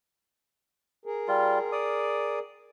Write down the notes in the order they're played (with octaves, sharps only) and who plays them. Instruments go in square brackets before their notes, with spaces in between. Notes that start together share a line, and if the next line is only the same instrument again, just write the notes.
[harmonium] G#4 A#4
[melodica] G3 F4
D5 D#6